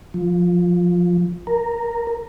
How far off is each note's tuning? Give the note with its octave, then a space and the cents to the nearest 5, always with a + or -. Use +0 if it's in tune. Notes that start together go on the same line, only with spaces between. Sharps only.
F3 +10
A#4 -5